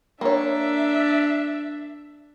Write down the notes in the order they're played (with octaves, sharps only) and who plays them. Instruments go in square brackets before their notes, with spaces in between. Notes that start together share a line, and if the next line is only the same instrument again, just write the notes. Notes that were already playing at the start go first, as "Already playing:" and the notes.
[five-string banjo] A#3 C#5 [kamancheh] D4 E5